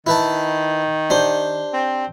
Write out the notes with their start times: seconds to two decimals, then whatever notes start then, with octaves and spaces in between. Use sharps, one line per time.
0.07 D#3 E4 B4 A5
1.10 D4 G4 C5
1.73 C4